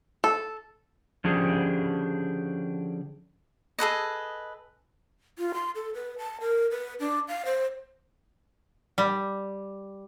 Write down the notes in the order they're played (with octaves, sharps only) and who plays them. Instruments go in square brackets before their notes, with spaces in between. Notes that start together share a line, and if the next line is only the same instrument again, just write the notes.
[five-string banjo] A4
[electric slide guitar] D3 F3 C#4 D4 G4 G#4
[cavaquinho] G#4 A4 B4 D#5
[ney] F4
C6
A4
B4
A5
A#4
B4
D4
F5
C5
[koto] G3